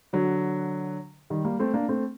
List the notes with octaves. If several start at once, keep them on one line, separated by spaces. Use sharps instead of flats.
D3 F#3
D#3 G3
G3 A#3
A3 C4
A#3 D4
A3 C4